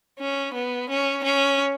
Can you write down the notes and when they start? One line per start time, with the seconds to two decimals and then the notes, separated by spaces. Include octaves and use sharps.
0.19 C#4
0.54 B3
0.90 C#4
1.24 C#4